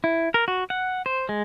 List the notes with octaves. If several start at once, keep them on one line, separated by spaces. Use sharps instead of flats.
E4
A#4
F#4
F#5
C5
G#3